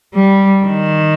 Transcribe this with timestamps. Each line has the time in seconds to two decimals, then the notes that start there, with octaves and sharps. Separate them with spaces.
0.14 G3
0.66 D#3